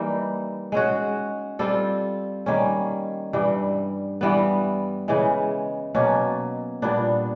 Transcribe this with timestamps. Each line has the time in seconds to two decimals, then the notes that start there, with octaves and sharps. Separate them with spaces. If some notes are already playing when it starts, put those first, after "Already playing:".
Already playing: E3 G3 A#3 D#4
0.72 G#3 C#4 F#4
1.59 G3 C4 F4 A4
2.46 D#3 G3 A#3 C#4
3.33 G2 E3 G3
4.21 E3 G3 B3
5.08 C#3 E3 G#3
5.95 B2 F#3 A#3 C#4
6.82 A#2 G3 B3 D4